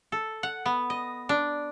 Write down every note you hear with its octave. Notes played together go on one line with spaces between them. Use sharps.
A4
F#5
B3
D#5
D4